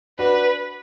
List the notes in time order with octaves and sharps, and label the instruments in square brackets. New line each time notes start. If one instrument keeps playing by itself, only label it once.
[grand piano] D4 F#4 [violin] B4